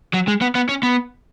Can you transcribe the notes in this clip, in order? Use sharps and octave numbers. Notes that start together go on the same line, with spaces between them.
F#3
G#3
B3
B3
C#4
B3